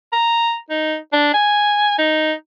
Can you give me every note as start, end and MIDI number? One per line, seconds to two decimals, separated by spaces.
0.13 0.55 82
0.70 0.96 63
1.13 1.30 62
1.34 1.98 80
1.99 2.33 63